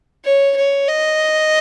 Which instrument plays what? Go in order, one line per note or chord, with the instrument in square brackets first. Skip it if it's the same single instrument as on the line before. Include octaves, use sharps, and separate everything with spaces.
[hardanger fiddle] C#5
C#5
D#5